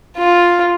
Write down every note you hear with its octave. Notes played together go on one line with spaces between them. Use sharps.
F4